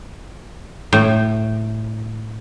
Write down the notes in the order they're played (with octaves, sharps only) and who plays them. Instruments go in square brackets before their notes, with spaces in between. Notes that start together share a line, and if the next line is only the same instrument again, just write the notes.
[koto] A2